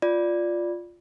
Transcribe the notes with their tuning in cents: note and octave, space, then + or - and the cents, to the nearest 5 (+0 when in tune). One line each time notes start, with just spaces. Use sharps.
F4 +0 D5 +0